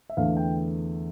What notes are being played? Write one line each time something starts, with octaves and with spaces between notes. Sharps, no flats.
E5
E2 D3 A3 F5
G5